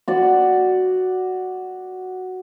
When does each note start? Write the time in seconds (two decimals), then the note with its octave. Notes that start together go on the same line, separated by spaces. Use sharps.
0.08 F#4 D5